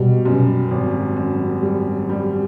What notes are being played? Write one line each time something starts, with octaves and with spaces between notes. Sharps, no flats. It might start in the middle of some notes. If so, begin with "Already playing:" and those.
Already playing: B2 G3
F#2
G#1
F#2
G3
G3